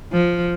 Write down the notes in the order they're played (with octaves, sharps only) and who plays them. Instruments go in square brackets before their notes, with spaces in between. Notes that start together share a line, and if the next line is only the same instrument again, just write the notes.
[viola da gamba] F3